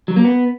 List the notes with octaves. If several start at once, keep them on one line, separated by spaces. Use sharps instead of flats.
F#3
A#3
B3